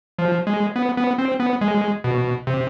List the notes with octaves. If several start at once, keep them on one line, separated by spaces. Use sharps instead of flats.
F3
G#3
B3
B3
C4
B3
G#3
B2
C3